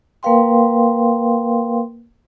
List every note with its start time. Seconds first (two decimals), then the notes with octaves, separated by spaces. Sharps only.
0.23 A#3 A#4 B4 F5 G5 C6